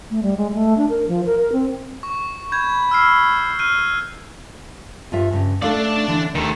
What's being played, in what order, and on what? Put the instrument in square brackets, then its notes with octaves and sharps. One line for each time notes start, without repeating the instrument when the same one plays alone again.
[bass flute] A3
G3
G#3
A3
D4
A#4
F3
A#4
A#4
C4
[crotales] C#6
[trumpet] B5 [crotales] G6 G#6
[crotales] E6 F6 C7
F6 F#6 D#7
[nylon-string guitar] G2 F4 E5
G2 C#3
[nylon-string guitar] A3 A4 F5 [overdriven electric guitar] D4 D5
[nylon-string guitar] D3 E3
[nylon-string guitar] D#2 [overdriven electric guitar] D#3 A3